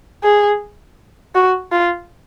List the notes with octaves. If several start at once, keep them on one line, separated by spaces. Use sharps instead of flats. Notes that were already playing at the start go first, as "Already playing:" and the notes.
G#4
F#4
F4